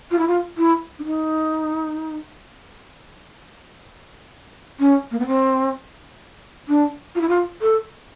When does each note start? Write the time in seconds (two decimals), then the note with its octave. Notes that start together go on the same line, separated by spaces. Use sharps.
0.11 F4
0.19 E4
0.28 F4
0.57 E4
0.99 D4
1.04 D#4
4.80 C#4
5.11 A#3
5.19 B3
5.27 C4
6.68 D4
7.15 F4
7.21 E4
7.29 F4
7.62 A4